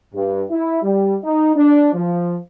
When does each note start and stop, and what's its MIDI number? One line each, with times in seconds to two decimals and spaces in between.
0.14 0.43 43
0.51 0.82 64
0.83 1.17 55
1.23 1.51 63
1.56 1.92 62
1.93 2.36 53